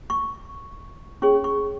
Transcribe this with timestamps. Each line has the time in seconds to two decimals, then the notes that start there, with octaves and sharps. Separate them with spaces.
0.10 C#6
1.22 C#4 G#4 C#5 C#6
1.44 C#6